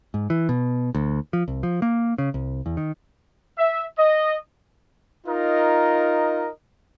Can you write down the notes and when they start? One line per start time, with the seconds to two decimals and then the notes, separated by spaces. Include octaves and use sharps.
0.14 G#2
0.30 E3
0.49 B2
0.95 D2
1.33 F3
1.48 C2
1.63 F3
1.82 A#3
2.18 C#3
2.34 C2
2.66 E2
2.77 D#3
3.58 E5
3.99 D#5
5.27 D#4 F4 A#4 D#5